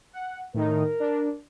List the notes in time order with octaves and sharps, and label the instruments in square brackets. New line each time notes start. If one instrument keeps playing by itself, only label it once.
[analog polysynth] F#5
[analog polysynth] A2 D#3 D#4 [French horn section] A#4
[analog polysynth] D4